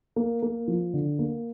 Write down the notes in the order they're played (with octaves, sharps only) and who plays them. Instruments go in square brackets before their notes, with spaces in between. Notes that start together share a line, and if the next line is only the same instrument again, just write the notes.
[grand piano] A#3
A#3
F3
D3
A#3